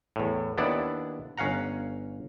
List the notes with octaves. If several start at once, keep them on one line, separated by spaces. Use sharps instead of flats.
E2 A2
D#2 B3 D4 E4 D5
G1 C#4 F5 F#5 A#5